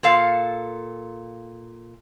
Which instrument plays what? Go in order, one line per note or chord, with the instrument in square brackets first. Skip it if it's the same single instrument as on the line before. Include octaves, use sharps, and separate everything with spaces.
[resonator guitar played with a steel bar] A#2 A4 F5